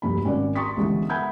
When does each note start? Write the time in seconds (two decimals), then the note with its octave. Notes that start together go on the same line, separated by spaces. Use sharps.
0.02 F1 D2 G2 A#3 B5
0.24 G#1 C#4 F#4 A#4 D5
0.56 A#5 C6 C#6 D#6 A6 B6
0.77 C#2 D3 E3 G3 G#3 B3
1.09 A#4 E5 F#5 B5 G6 G#6